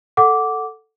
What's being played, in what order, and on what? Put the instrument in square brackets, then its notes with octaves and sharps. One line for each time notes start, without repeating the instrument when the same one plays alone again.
[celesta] A4 F#5 D6